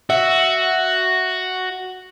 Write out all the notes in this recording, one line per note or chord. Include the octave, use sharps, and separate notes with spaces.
F#4 E5